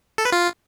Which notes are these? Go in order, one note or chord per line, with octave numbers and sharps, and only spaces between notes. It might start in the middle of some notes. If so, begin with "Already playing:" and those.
A4
B4
F4